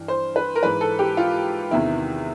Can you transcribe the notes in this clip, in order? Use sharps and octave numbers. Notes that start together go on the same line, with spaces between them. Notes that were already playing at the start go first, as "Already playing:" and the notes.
Already playing: G2 E3
C5
B4
A#4
G#2 E3 B4
A4
G4
F4
E2 C3 D#3 E4